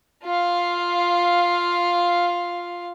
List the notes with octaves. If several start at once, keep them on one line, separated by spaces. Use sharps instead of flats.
F4 F5